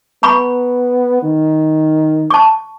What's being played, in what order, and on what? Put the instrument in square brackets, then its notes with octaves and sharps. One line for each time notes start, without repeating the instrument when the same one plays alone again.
[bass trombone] B3 [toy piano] A#5 B5 C#6
[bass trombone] D#3
[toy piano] A5 C#6